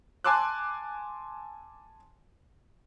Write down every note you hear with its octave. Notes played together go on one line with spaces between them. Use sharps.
G#5 A5 C6 D6 E6 F#6